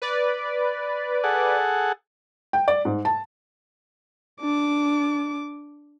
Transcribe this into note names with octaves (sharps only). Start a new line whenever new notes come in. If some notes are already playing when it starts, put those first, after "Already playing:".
B4 D5
G#4 A4 F#5
G5
D5
G#2
A5
D4 D6